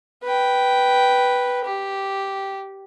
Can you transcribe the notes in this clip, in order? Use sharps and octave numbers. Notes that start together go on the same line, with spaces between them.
B4 G5
G4